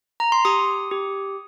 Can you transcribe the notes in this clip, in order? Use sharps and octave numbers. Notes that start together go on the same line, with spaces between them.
A#5
C6
G4 D#6
G4